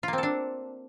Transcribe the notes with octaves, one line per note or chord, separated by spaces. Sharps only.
A#3 C4 D4 F4 A4